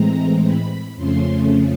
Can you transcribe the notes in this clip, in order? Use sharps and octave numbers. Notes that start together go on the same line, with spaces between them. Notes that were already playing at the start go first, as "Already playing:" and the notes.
Already playing: A2 E3 G#3 C4 A#5
B5
F2 C#3 F3 A3 C#4 C6